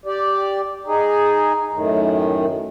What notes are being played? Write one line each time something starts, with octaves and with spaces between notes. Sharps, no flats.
G4 D5
D#4 G#4
F#2 A2 D#3